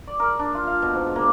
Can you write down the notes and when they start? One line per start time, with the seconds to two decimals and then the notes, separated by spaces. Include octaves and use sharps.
0.08 D5
0.20 A#4
0.39 D4
0.55 F4
0.67 F5
0.82 B2
0.94 G#2
1.16 A#3